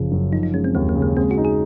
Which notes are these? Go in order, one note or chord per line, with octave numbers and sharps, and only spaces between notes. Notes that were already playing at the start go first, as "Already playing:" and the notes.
Already playing: F#1 C#3 F3
F#2
F3 D#4
D#4
G#3 C#4
C4
D#2 A#3
A#3
C#3
A#3
G#3 C4
F#4
D#4
G#4